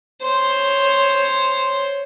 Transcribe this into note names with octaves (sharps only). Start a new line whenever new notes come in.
C5 C#5